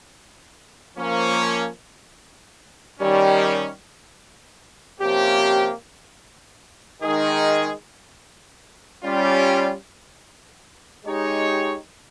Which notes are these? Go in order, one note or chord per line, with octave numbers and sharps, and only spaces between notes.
F3 A#3 C#4
D#3 G3 C#4
C3 F3 A#3 C#4 G4
D#3 G#3 D#4 G#4
G3 C#4 F4
G#3 D#4 G4 C#5